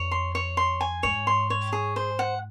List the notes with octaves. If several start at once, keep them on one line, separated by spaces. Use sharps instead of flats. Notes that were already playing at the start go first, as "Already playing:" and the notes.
Already playing: F2 C#5
C6
C#5
C6
G#5
G#2 C#5
C6
C#5
G#4
C5
F#5